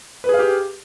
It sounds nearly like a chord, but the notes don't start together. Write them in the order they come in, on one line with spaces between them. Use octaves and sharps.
B4 G#4 F5 G4